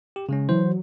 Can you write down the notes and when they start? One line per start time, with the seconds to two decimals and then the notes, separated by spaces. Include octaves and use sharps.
0.16 G4
0.29 C#3 G#3 C#4
0.49 E3 F#3 C5